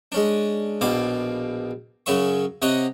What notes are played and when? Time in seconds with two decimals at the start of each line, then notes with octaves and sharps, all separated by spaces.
0.12 G#3 C#4 D4
0.81 A#1 B2 F4 D6
2.06 F#2 C#3 C#4 E5 C#6
2.62 C3 C#5 D#5 F#5